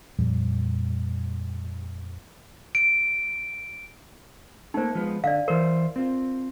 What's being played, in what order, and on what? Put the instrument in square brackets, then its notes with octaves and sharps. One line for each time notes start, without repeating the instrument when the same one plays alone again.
[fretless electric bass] F2 A#2 F3 G3
[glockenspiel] D7
[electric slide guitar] A3 A#3 [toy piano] D#4 C5
[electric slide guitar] F3 G#3 B3
[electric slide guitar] D3 [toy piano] D5 F5
[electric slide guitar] E3 C5 [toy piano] A#4
[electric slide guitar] C4 F4